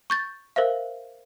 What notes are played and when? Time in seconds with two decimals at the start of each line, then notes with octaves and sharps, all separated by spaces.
0.10 C#6 G6 A6
0.56 A#4 C5 E5 F5